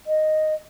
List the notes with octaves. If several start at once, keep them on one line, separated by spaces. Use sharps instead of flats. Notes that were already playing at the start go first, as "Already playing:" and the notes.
D#5